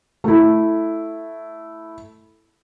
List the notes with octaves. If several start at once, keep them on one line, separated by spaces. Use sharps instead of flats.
A3 E4